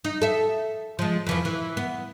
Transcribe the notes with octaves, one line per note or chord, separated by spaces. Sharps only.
D#4
A4 E5
F3 G#3
F2 E3 F3
E3
B3